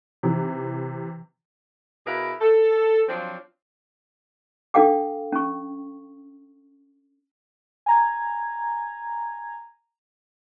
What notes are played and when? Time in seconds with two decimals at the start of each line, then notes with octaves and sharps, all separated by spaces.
0.23 C3 E3
2.05 B2 E4 G#4 A#4 B4 F5
2.40 A4
3.08 F3 F#3 C4 D4 F4
4.74 D4 A4 F5 G5 D6
5.32 C#4 C#6
7.86 G#5 A#5 G#6